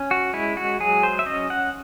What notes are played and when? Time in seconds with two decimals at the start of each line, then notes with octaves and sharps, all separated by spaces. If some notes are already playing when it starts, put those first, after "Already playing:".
Already playing: C#4
0.11 F#4
0.33 G#3 E4
0.57 F#4
0.80 F#3 G#4
1.03 C5
1.19 E5
1.26 C#4 D#5
1.50 F#5